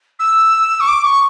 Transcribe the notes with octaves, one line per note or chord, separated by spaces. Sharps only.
E6
C#6
D6
C#6